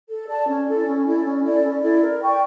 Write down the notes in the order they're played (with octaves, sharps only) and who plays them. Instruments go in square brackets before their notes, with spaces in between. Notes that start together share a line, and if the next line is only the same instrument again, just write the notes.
[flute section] A4
D5 A5
C#4
E4 A4 D5
C#4
E4 A4 D5
C#4
E4 A4 D5
C#4
E4 A4 D5
A#4
D5 G5 C#6